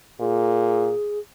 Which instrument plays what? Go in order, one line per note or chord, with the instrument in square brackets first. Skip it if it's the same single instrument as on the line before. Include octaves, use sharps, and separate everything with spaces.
[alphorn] A#2 [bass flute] G#4